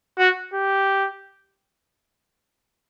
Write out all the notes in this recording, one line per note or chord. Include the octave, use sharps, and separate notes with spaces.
F#4
G4